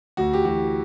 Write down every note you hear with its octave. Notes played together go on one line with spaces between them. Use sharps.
D2 F#4
G4
E3 F#4